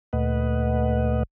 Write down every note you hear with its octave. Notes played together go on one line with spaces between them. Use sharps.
D2 A#2 A3 B4 D#5 F#5